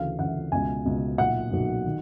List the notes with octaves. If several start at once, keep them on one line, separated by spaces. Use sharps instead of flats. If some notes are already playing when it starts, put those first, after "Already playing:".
Already playing: D2 C#3 E3 F5
D2 C#3 E3 F#5
C#2 B2 G#5
C#2 B2
B1 A#2 F#5
B1 A#2
D#3